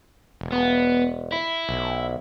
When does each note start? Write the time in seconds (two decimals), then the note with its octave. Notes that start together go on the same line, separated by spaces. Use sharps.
0.41 E1
0.52 B3
1.32 E4
1.69 B1